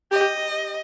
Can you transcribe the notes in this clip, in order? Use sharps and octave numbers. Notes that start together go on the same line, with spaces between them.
G4 D#5